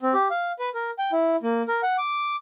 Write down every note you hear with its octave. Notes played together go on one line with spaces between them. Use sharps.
C4
G4
F5
B4
A#4
G5
E4
A#3
A#4
F#5
D6